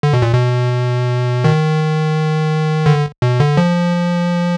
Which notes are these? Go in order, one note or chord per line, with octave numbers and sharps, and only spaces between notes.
D3
B2
A#2
B2
D#3
D3
B2
D3
F3